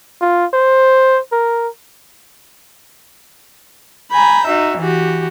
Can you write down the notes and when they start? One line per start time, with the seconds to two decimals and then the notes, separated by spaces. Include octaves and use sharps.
0.21 F4
0.54 C5
1.32 A#4
4.12 G#5 A#5 B5 G6
4.48 D#4 F#4 E5
4.79 E3 F#4 G4